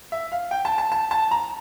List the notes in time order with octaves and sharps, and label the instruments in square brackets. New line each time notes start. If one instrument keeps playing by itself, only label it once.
[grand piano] E5
F5
G5
A5
A5
A5
A5
A#5